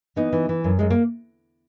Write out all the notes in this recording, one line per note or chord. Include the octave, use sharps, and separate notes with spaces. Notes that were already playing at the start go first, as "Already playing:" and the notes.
E3 B3 D#4
E3
E3
F#2
F#2 G#3
A#3